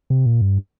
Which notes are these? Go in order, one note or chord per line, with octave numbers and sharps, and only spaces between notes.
C3
A#2
G2